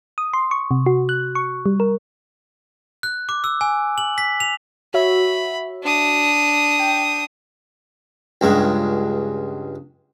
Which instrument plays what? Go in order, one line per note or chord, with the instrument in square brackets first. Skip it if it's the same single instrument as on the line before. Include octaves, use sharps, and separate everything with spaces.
[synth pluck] D#6
C6
C#6
C3
F#4
F#6
C#6
G3
A#4
[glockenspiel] F#6
D6
E6
G#5
F#7
B6
F7
[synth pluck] F#4 C#5 E5 [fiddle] B5
[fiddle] D4 D#6
[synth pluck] G5
[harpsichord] C#2 G2 G#3